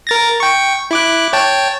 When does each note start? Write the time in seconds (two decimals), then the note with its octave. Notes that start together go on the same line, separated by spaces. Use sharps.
0.07 A#4 A6 A#6
0.40 G5 C#6
0.91 E4 D6 F#6
1.33 C#5 G5 A5